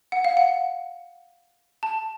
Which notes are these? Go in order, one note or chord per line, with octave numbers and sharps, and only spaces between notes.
F#5
F5
F#5
A5